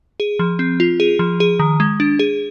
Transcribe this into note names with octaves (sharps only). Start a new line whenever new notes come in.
G#4
F3
C4
F4
G#4
F3
G#4
D#3
G#3
D4
G#4